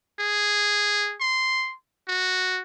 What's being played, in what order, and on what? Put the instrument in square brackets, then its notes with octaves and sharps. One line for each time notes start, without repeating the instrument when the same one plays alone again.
[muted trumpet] G#4
C6
F#4